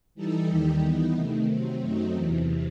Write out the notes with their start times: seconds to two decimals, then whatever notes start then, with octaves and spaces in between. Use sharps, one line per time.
0.15 E3 G3 D#4 A4
0.47 D#2 D#3 G3 D#4 G4
0.81 E3 B3 D#4
1.14 C3 D#3 A3
1.48 C3 F#3 C4
1.81 F#2 F#3 A3 C4 D#4
2.14 E2 C3 E3